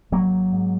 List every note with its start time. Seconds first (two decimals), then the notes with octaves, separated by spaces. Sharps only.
0.12 G#1 F#3 A#3
0.53 G#2